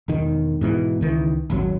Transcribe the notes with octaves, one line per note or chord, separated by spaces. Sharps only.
E1 D#3
G#2 B2 D#3 E3
C#2 D#3 E3
D#1 G#1 F#3